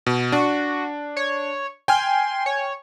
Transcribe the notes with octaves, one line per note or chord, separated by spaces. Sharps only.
B2
D4 F#4
C#5
G5 G#5 C6 F6
C#5